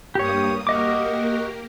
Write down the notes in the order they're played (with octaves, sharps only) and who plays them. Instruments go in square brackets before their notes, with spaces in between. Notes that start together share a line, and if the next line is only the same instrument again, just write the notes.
[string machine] G2 A#3 D#6 [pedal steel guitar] G4 C#5
[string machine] A#3 G4 A#4 [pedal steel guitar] F#4 D#5 D6